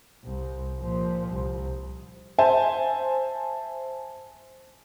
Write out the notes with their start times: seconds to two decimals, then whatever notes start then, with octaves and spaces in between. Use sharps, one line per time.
0.24 C2
0.80 A#2 F3
1.31 C2
2.38 C5 E5 G#5 A5